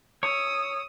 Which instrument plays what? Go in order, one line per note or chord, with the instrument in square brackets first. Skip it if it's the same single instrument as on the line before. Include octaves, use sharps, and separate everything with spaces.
[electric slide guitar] C#5 [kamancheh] D#6 E6